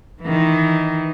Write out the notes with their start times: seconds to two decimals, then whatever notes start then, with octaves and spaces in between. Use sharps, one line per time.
0.22 D#3 E3